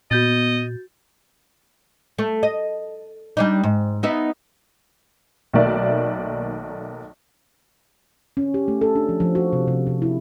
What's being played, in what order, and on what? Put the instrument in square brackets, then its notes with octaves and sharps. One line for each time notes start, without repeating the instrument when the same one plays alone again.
[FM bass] A#2 [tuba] B3 [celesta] F#4 G6 A6 [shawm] D#5
[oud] A3
D#5
G3 D4 D#4
G#2
B3 D#4 E5
[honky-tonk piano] B1 D#3 A3 A#3 D5 E5
[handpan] C#4
G4
A3
A4
D4
F3
F3
F#4
C3
C3
C3
E4